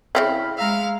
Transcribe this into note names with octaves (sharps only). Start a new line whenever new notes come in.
C#3 C4 C#4 E4 F5 B5
G#3 E5 F5 A#5 F6